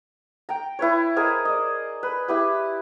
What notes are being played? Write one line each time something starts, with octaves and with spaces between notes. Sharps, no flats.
G5 A#5
E4 B4 C#5
G#4 A#4 C5 D#5
D5 D#5
B4
E4 G4 B4